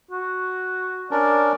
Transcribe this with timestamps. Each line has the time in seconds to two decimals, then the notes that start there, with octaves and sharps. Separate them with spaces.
0.11 F#4
1.11 C#4 D4 A#4 D5